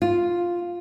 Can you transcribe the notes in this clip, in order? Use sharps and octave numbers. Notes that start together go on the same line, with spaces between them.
F4